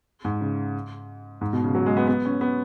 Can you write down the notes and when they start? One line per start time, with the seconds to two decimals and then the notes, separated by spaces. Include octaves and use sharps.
0.25 G#2
0.41 C#3
1.41 G#2
1.53 B2
1.64 C#3
1.75 F#3
1.86 G#3
1.97 B3
2.07 B3
2.25 C#4
2.41 B3